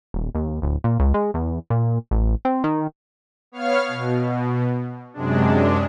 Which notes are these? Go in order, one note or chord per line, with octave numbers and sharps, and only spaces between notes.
D#1
D#2
D1
A#2
C#2
G#3
E2
A#2
A1
C4
D#3
B3 C#5 F5 F6
B2
F#2 C3 G#3 D4